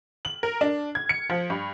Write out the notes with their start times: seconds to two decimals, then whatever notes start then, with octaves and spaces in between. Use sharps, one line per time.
0.25 F#7
0.43 A#4
0.61 D4
0.95 G#6
1.09 C#7
1.30 F3
1.50 G2